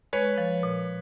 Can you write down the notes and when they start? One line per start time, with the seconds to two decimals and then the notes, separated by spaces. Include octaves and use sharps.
0.13 G#3 B4 C#5
0.38 F3
0.63 A#2